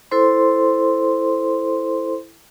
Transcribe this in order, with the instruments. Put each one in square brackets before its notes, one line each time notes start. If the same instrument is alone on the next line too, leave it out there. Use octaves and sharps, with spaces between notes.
[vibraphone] E4 A4 C5 C6